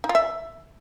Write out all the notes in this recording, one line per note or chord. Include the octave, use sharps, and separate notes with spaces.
D#4
F4
E5